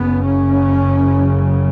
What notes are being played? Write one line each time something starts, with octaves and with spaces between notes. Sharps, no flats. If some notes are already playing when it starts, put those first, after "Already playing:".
Already playing: F#1 F#2 C#3 B3
C#4